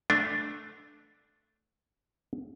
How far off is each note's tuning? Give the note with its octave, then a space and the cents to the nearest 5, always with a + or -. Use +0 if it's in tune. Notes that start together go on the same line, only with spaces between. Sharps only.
A3 +0 D4 +0